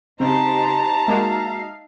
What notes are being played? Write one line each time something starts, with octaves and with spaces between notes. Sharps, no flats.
C#3 C4 D#4 G4 C5 A5 A#5
G#3 A#3 D#4 F#4 E5 F5